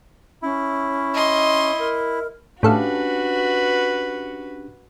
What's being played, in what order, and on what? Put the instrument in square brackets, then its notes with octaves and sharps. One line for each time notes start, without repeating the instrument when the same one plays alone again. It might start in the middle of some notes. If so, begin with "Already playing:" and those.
[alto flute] C#4 [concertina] E4
[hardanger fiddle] D#5 C6
[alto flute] A#4
[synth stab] A2 A4 F5 [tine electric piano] C#4 D4 G4 [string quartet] F#4 B4